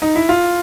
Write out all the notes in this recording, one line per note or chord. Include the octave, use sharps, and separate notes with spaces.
D#4
E4
F4